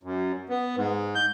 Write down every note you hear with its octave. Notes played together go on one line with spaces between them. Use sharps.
F#2
B3
G#2
G6